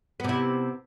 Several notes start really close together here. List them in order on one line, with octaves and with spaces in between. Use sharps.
B3 C3 E4